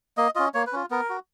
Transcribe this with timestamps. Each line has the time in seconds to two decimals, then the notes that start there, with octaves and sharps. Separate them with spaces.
0.17 A#3 D#5
0.35 C#4 F4 D#5
0.54 A#3 C#5
0.67 B4
0.73 C#4 F4
0.91 B3 A#4
1.09 F#4